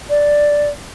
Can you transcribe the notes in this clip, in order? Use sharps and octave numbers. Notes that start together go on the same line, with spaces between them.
D5